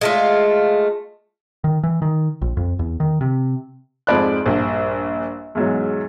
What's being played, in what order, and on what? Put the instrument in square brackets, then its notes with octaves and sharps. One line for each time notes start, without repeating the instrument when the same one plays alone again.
[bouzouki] G#3 A3 F4
[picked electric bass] D#3
E3
D#3
A#1
F2
E2
D#3
C3
[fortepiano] F2 G#2 F3 D5 B5 F#6
A#1 G2
E2 G#2 F#3